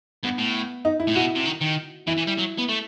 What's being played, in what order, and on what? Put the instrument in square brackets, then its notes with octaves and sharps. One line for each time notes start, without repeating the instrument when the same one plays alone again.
[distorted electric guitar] G2 [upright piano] B3
[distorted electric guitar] A2
[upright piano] D#4
E4
[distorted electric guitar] A2
[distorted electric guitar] B2 [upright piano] F#4
[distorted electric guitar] C3
D#3
D#3
[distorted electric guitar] E3 [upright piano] E4
[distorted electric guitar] E3
G3
F#3
B3
A3